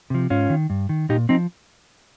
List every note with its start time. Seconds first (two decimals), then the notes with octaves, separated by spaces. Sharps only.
0.10 C3 F3
0.30 G#2 C#4 F4
0.50 D#3
0.70 G2
0.89 D#3
1.09 A#2 D#4 G4
1.29 F3 C4 D#4